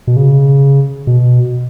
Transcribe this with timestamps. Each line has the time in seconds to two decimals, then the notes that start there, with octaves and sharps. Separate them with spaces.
0.07 B2
0.17 C#3
1.07 B2